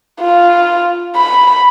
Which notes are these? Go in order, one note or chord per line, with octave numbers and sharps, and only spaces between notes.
F4
B5